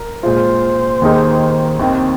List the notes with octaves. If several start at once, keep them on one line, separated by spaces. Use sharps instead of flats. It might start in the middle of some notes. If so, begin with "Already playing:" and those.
Already playing: A#4
A#2 G#3 F4 C5
D#2 D#3 A#3 D#4 G#4
D#2 D#3 C4